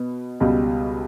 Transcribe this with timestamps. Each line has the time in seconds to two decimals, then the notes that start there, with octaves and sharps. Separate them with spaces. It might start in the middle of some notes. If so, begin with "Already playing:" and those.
Already playing: B2 B3
0.40 C#2 B2 G3